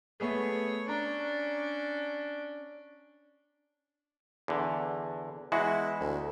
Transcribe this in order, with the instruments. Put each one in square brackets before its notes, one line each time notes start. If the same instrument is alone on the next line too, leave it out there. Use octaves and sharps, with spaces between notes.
[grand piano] A3 B3 G#4 [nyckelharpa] C#5
[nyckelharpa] C#4 D4 [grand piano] A#5
[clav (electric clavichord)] E2 D3
[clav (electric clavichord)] E2 G#3 F#4 [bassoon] E4
[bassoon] D2